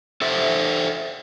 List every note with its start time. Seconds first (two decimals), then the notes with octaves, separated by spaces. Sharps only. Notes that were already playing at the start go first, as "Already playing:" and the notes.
0.21 A4 C5 E5